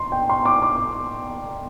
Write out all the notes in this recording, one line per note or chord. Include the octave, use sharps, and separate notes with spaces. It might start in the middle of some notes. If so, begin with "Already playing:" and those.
Already playing: C6
G5
C6
D6
D6